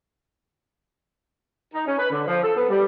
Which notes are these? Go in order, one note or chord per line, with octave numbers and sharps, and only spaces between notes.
D#4
C#4
B4
D3
F3
A4
B3
G3